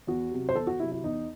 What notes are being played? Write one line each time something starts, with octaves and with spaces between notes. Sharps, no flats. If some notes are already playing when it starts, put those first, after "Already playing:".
E2 F#4
C3 F#3
C5
E2 A4
F#4
C3 F#3 E4
E4
E2 D#4